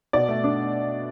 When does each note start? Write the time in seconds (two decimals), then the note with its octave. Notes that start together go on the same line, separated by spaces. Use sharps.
0.13 B2 D5
0.29 A3
0.44 D4